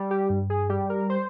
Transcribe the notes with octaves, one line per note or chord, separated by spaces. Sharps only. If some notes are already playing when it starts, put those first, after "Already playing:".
Already playing: G3
G4
G2
G#4
G3 G4
A#4
C5